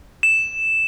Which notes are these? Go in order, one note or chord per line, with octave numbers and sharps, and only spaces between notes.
E7